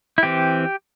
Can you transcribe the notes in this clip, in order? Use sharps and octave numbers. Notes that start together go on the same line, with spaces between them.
E4
E3 C4 G4